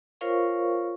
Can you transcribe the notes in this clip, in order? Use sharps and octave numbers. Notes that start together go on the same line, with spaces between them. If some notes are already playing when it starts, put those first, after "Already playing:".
F4 A#4 C5 C#5 F5 C#6